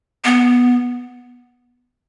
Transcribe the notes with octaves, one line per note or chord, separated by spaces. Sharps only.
B3